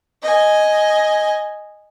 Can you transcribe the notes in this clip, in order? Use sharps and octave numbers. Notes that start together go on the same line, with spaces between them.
D#5 G#5